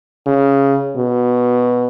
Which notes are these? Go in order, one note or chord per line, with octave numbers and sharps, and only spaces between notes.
C#3
B2